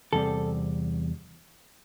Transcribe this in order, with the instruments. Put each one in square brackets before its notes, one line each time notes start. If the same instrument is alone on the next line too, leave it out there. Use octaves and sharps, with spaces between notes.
[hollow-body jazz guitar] E2 C3 G3 C4 A4